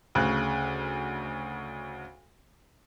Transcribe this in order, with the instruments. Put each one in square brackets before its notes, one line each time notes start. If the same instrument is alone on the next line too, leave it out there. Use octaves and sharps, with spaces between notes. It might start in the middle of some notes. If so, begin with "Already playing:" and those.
[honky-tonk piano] D2 C#3 F#6